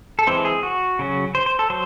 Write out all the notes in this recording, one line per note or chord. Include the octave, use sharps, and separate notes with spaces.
A4
E3 G#3 C4 C5
G#4
F#4
C#3 F#3 C#4
C5
C5
A4
F#3 C5